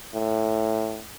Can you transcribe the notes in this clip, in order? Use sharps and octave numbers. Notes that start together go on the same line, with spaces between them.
A2